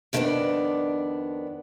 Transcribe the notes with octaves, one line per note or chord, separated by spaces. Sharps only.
F2 D#3 A3 B3 D4 D5